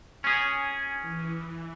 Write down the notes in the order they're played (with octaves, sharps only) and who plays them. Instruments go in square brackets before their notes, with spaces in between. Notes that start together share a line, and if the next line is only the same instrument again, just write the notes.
[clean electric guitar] C#4 G#4
[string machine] E3